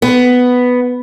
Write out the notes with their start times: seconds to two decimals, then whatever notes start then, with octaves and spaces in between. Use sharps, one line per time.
0.02 B3